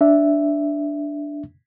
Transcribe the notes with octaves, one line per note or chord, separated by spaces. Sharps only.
D4 E5